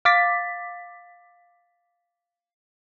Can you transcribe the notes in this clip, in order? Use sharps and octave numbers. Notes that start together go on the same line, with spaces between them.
F5 D6 A6 B6